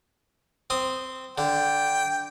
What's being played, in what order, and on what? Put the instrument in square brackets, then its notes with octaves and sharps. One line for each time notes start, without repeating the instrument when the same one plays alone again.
[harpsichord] C4 D#6
[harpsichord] D3 [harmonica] G5